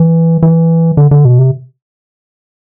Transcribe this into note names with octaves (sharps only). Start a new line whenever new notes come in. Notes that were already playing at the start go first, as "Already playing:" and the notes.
Already playing: E3
E3
D3
D3
B2
C3